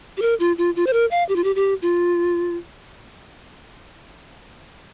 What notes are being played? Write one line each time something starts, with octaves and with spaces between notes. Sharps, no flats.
G4
A#4
F4
F4
F4
C5
A#4
F5
G4
F4
G4
G4
F4